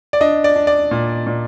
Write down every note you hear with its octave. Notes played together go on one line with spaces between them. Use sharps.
D5
D4 D#5
D5
D4
D5
A#2
A#2